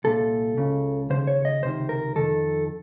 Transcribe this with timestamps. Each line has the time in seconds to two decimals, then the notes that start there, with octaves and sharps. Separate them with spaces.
0.04 C2 A#2 A4
0.57 C#2 C#3
1.10 D#2 C#3 C5
1.27 C#5
1.45 D#5
1.63 C#2 C3 D#3 C5
1.89 A#4
2.16 F2 D#3 A4